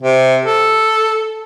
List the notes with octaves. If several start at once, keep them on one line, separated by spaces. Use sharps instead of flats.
C3
A4